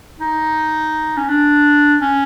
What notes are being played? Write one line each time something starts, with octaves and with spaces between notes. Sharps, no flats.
D#4
C#4
D4
C#4